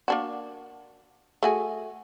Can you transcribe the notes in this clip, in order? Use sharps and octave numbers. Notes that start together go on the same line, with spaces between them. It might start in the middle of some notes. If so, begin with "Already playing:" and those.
A#3 D4 F#4
A3 F#4 G#4